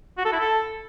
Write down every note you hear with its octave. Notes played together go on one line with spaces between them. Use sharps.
F#4
A4
E4
A4